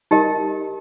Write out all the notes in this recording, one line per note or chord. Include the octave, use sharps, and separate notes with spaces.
D#4 G4 A#4 D#5